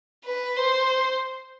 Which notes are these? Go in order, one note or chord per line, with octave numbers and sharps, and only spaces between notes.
B4
C5